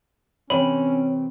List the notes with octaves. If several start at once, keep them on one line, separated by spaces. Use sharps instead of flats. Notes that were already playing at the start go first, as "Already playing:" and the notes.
C3 E3 C4 C#4 C#5 B5